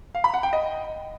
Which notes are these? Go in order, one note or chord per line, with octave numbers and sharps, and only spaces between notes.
F5
B5
F#5
G5
D#5